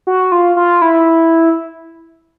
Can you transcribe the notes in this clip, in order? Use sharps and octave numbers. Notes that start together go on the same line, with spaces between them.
F#4
F4
F4
E4